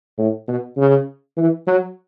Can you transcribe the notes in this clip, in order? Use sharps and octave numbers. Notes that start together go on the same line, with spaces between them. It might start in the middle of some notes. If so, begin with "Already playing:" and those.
A2
B2
C#3
E3
F#3